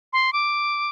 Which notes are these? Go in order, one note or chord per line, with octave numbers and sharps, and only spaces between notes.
C6
D6